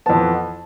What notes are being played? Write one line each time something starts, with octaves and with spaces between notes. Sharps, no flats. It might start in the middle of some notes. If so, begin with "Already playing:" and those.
F2 E3 B3 A5